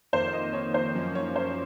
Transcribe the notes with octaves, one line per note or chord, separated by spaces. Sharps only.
F2 D#3 A#3 C5
D#5
C#5
C5
F#2 F3 A#3 C#4
C#5
C5